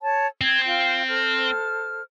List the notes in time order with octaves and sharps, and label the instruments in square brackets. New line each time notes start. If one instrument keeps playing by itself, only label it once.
[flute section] C#5 A5
[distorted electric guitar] C4 [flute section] G#6
[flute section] F4 G5
A4 C5 F6